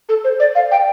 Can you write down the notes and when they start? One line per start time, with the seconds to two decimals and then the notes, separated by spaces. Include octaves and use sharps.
0.09 A4
0.24 C5
0.40 D5
0.55 F5
0.71 G5